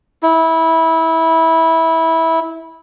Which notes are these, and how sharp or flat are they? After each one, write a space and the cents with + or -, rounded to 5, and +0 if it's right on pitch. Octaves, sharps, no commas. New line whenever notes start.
E4 -20